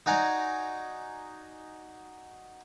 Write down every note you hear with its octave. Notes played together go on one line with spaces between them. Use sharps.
D#4 F#4 D5 G#5 A#5